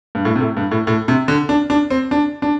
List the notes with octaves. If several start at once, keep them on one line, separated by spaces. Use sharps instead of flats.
G2
A2
C3
A2
G2
A2
A2
C3
D3
D4
D4
C4
D4
D4